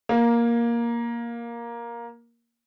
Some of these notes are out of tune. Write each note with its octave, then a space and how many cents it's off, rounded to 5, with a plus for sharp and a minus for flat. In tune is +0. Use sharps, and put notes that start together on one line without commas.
A#3 +10